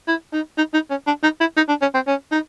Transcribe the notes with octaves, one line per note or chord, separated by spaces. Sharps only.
E4
D#4
D#4
D#4
C#4
D4
D#4
E4
D#4
D4
C#4
C4
C#4
D#4